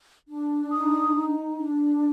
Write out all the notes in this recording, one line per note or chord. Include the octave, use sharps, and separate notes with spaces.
D4
D#4 D#6
D#4
D4